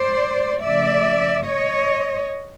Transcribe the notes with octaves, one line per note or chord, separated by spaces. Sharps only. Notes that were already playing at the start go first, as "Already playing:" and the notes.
Already playing: C5 D5
C#3 F3 A3 D5 E5
C#5 D#5